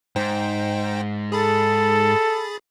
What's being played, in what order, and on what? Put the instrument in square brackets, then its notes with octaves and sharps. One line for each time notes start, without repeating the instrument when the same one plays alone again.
[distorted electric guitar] G#2 [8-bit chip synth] D#4 C5 G5
[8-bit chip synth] G#4 B5 A6 [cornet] A4